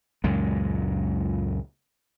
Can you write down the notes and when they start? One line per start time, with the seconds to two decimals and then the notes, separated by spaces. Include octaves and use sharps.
0.24 C#2 F#2 A#2 G#3